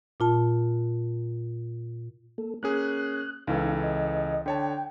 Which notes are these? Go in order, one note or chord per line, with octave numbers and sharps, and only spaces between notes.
A#2 F4 A5
A#3 A4
A#3 C#4 G#4 F#6
C#2 E3 D#4 A4 F5
D#5
D3 C#5 G5 A5